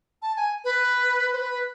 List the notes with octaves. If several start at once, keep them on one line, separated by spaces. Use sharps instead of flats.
A5
G#5
B4
C5
B4